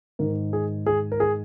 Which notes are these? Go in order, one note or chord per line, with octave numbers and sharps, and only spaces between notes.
G#2 D#3 A#4
G#4
G#4
A#4
G#4